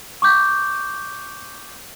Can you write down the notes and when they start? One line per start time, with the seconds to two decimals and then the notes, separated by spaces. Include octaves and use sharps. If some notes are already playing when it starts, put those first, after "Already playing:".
0.22 C#6 D6 G6